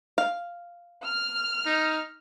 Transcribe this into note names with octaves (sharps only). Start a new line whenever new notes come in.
F5
F6
D#4